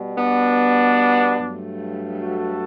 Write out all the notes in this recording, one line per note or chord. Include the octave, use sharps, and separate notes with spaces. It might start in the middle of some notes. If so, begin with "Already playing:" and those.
Already playing: B2 G3
B3 D4
G2 F#3 A3
F#4 A4